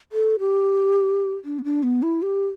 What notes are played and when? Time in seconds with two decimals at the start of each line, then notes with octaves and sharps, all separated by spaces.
0.12 A4
0.40 G4
1.45 D4
1.59 B3
1.64 D4
1.83 B3
2.03 E4
2.22 G4